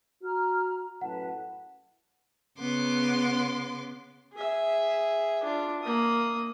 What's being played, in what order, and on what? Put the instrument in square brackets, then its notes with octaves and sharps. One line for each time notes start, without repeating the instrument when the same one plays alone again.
[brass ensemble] F#4 [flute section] A#5 F6
[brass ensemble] F#2 A2 [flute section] B4 A5 [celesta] F#5
[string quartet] C#3 B3 C6 D6
[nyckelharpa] G#4 E5
D4 F4
A#3 D#6